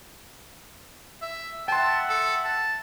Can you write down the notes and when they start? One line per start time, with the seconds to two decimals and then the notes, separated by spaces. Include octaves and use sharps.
1.22 E5
1.68 E5 F#5 G5 A5 C6
2.09 A4
2.45 A5